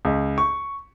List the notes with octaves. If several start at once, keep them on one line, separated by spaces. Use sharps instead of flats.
C#2
C#6